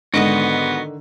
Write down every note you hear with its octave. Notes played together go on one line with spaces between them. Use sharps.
G#2 D3 D#3 B3 F#4 D#5